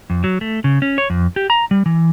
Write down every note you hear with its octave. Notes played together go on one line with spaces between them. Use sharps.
F2
F#3
A3
C#3
C#4
C#5
F2
G4
A#5
G3
E3